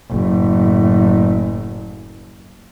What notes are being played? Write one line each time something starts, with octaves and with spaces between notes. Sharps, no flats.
F#1 A2